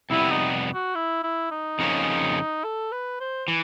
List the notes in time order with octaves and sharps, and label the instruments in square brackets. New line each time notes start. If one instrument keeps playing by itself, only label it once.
[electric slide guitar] F2 C3 G3 B3 [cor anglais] E4
[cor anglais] D#4
F#4
E4
E4
D#4
[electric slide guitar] F2 C#3 F3 A#3 C#4
[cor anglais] A4
B4
C5
[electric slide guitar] E3